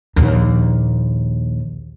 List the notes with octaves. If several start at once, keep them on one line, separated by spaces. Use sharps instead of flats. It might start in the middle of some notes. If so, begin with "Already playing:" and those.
A#1 D#2